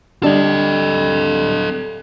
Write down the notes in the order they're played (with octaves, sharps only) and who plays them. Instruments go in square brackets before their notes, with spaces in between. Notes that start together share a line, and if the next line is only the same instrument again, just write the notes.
[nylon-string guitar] D3 G3 D4 [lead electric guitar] A4 D#5